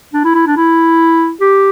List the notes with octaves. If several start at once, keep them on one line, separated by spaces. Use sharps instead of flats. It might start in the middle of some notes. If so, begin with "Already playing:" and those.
D4
E4
E4
D4
E4
G4